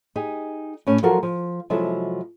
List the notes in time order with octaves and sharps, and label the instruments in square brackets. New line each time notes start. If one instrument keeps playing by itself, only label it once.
[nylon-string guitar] D#4 G4 G#4
A2 C#4
F3 F#3 F4 F#4 A4 A#4
F3
C3 F3 F#3 G#3 E4 A4